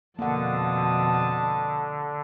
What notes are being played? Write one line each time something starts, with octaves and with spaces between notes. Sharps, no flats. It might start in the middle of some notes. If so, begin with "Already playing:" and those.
F2 B2 D3 A#3 F#5 A5 D#6